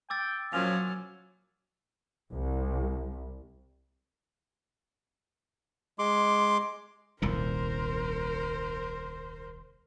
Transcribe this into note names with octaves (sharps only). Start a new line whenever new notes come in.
G5 D6 E6 A6
A#2 F3 F#3 C#4 G#5 F7
C2
G#3 C6 D6
D#1 C2 A#2 A#4 C5